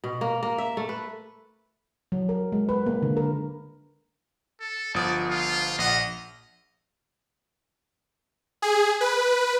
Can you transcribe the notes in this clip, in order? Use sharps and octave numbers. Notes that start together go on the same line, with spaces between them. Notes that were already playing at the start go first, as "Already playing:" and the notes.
B2
A#3
A#3
E5
A3
B4
F#3
A#4
G#3
B4
A#3
D3
A#4
A4
G1 F3 D5 D#6
F4
A#1 D#5 F#5
G#4
B4